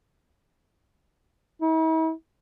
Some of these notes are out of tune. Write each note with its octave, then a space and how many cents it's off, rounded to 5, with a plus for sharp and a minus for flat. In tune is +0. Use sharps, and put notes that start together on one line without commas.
E4 -45